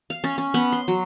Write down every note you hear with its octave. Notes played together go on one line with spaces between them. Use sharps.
F5
C#4
C#4
B3
C6
F#3